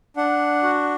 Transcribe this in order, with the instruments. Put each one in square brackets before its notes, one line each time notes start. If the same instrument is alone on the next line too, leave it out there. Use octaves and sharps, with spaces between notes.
[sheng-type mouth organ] D4 F#5
F#4